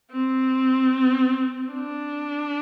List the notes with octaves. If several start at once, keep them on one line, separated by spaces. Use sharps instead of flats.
C4
D4